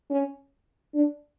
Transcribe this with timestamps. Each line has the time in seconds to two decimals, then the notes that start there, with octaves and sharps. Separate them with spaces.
0.10 C#4
0.95 D4